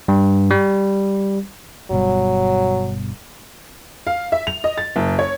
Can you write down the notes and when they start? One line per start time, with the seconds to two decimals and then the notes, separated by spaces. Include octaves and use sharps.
0.08 G2
0.51 G3
1.91 G1 B2 F#3 G3
4.07 F5
4.32 E5
4.47 F7
4.64 D#5
4.78 A6
4.96 F#1
5.19 C#5